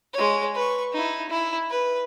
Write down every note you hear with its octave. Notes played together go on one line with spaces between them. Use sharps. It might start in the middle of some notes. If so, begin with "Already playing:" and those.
G#3 C#5
B4 C#6
D#4 E4
E4
B4